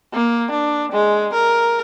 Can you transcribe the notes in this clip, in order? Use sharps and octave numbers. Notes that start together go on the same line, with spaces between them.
A#3
D4
G#3
A#4